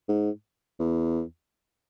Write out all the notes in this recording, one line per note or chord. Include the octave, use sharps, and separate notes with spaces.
G#2
E2